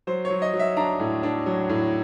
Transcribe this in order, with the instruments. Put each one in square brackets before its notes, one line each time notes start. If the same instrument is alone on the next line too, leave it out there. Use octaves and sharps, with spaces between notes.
[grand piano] F#3 C5
C#5
F#3
D#5
F#3
E5
D4 A#5
A2
D4
F#3
A2